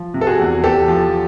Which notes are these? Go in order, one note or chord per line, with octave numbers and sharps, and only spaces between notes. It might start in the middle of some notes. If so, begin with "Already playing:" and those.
Already playing: F3
C3
A4
F#4 G#4
E2
E2 G4 A4
F3